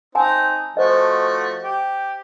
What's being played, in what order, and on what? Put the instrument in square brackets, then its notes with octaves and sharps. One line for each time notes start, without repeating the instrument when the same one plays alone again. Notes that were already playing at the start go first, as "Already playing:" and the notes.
[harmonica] C4 D#4 [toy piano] G#5 A5
[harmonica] F3 A3 F#4 [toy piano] C5 D#5
[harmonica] G4